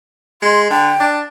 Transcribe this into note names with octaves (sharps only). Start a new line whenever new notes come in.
G#3 C6
D3 G5
D4